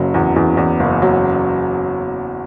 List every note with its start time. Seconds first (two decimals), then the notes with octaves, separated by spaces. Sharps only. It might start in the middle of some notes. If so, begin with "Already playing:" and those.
Already playing: F#1 C#3 F#3
0.14 E2
0.36 E2
0.57 E2
0.80 F#1
1.02 F#3